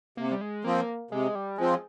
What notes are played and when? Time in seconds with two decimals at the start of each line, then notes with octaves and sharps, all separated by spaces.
0.17 C3 A#3
0.32 G3
0.41 G#3
0.64 F3 A#3 C4
1.11 C3 G#3
1.35 G3
1.58 F3 G#3 C4